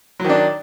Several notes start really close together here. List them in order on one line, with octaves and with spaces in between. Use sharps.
F#3 D#3 D4